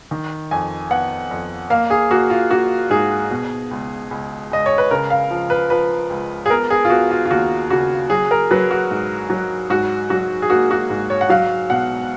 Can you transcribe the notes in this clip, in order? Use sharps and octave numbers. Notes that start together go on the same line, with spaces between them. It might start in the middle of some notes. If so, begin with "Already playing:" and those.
D#3
F2 G#5
B3 F#5
F2
A#3 F5
G#4
A#3 F#4
F4
A#3 F#4
G#2 G#4
B2
C#2
C#2
C#2 D#5
C#5
B4
C#3 A#4
F5
F3
B4
F3 B4
C#2
G#4
B3 A#4
G#4
F4
B3 F#4
F4
F4
D#2 F#4
C#3 F#4
F#3 G#4
A#4
F#3 B4
F#4
G#2
F#3
G#2 F#4
F#3 F#4
G#4
A#3 F#4
F#4
G#2
C#5
F#5
F#3 F5
B2 F#5